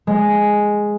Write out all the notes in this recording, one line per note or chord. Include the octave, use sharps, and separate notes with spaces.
G#3